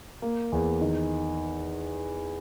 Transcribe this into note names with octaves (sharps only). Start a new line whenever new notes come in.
A#3
E2
D#3